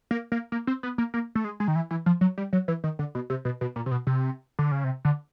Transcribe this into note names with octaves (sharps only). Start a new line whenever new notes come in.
A#3
A#3
A#3
C4
B3
A#3
A#3
A3
G#3
G#3
D#3
E3
E3
F3
F#3
G3
F#3
E3
D#3
D3
B2
C3
B2
B2
A#2
C3
B2
C3
D3
C#3
C3
D3